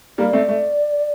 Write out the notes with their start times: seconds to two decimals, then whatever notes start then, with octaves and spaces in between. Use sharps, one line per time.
0.18 G3 A#3 D5
0.33 A3 C4
0.49 A3